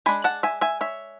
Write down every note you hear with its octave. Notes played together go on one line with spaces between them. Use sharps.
G#3 D4 G#5 B5
F#5 A5
E5 G#5
E5 G#5
C#5 E5